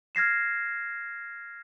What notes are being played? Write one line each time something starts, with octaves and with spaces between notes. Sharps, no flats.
F6 G#6 A#6 C7 E7